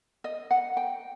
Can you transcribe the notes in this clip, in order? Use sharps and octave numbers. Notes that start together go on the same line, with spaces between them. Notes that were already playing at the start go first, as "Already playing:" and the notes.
D#5
F#5
G5